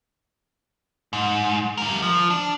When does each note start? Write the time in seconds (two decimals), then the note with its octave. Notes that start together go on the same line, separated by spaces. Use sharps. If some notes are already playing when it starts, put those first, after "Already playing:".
1.13 G#2
1.77 G3 A#4
2.02 F3
2.30 D4